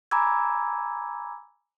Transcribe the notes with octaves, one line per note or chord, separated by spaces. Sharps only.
G#5 A#5 B5 D6 E6 G#6